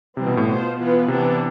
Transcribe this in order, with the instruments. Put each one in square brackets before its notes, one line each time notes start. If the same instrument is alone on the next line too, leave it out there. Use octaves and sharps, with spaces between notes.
[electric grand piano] C3 [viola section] E3 G3 C4
[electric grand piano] B2
A2
[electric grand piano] B2 [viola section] B3 F4 C5
[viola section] E3 B3 F4 B4
[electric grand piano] C3 [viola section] E3 B3 D4